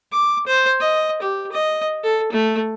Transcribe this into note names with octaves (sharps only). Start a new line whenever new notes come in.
D6
C5
D#5
G4
D#5
A4
A3